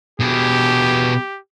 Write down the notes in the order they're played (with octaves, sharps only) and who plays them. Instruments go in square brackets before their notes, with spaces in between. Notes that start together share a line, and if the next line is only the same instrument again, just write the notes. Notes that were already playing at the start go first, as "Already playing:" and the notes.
[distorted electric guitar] B2 G#4 [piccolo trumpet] G4